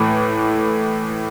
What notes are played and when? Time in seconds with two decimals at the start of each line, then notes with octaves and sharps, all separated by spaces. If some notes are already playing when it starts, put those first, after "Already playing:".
Already playing: A2 E3 A3